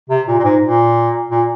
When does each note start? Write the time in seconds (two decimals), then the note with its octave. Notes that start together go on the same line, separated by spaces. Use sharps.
0.09 C3
0.28 A#2
0.39 A#2
0.44 G#2
0.62 A#2
1.30 A#2